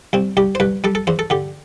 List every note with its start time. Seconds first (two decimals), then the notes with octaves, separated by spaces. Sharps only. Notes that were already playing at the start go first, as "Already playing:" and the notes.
0.13 C2 C4
0.37 C2 G4
0.55 C5
0.60 C2 B4
0.84 G3 A4
0.95 A4
1.07 E2 C5
1.19 A4
1.30 D3 G4